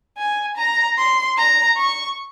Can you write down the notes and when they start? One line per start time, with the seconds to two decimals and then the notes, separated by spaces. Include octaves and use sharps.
0.18 G#5
0.57 A#5
0.97 C6
1.37 A#5
1.77 C#6